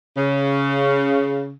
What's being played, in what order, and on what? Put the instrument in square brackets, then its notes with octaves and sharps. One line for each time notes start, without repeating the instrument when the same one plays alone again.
[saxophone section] C#3